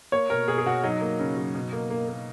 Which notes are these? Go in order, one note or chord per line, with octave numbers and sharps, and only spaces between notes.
A#3 C#5
B2 A#4
B2 G#4
G#4
B2 F#4
F#3 D#4
A#3
C#3
F#3
B2
A#3
A#3
A#3